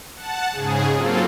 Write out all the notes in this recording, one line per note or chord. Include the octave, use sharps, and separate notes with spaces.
F#5 A5
G#2 C#3 G#4
F#3 A#3 C4 F4 A4